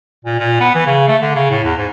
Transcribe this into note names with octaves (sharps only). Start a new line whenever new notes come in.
A#2
A#2
B3
E3
C#3
A3
D3
C#3
A2
E2
G#2